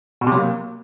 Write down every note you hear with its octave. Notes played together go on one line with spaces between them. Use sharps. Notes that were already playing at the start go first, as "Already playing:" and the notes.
B2
C3
F#3
A#3